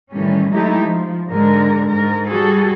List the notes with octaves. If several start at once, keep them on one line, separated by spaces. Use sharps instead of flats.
A2 D#3 E3 G3 C#4
F#3 G#3 A3 D#4 E4 G4
F3
G#2 D3 G#3 A#4
G#2 A#4
G3 F#4 G#4 A4